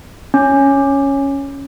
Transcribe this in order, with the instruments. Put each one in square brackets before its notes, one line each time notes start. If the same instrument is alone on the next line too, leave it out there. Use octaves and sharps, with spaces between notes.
[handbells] C#4